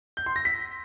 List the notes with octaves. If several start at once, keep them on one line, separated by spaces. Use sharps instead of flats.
G6
C6
A#6
B6